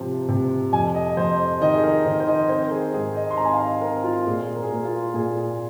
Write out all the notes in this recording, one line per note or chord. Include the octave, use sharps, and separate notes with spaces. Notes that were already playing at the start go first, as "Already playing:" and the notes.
Already playing: C3 F3
C3
F2 G#5
D#5
F2 C5
D#3 D#5
G#4
A#4
D#3 C5
C5
D#5
C4 C5
A#4
G#4
G#2 G#4
D#5
C6
C4 A#5
G#5
F5
D#5
C4 A#4
F4
A#2 G#4
A#4
G#4
A#3 A#4
F4
A#2 G#4